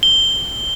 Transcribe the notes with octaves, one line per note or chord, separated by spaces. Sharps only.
G7